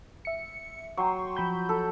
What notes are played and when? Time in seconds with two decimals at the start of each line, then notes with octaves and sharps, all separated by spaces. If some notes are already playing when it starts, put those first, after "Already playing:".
0.25 E5 C#7
0.97 F#3 G5 C6 C#6
1.36 F3 B5 G6
1.69 A4